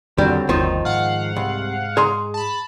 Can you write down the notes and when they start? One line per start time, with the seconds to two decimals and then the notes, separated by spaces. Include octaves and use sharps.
0.18 F2 D3 D#3 F#3 G3 C4
0.49 G1 D#2 D#3 F3 D#4
0.85 G#2 F5 F#5
1.36 C2
1.97 G#4 A#5 C6
2.34 A5 B5